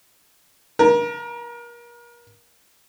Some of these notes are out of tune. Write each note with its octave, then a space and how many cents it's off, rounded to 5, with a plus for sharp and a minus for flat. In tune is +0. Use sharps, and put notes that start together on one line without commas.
A#4 +35 A#5 -35